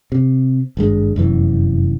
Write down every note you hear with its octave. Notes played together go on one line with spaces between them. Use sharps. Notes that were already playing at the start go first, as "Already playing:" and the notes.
C3
G#1 G2 G#3
F1 F#2 E3 B3